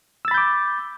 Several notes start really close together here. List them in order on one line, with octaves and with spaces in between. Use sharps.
E6 A6 B5 G6 D6